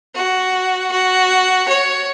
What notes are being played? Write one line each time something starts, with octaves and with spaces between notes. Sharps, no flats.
F#4
F#4
C#5